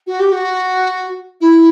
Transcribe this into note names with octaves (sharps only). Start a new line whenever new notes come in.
F#4
G4
F#4
E4